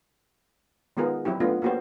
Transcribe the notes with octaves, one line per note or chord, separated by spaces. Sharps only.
D#3 G#3 B3 F4 G#4 A#4
F#3 C4 E4 G4
A3 B3 D4 F4
A#3 B3 F#4 G4 C5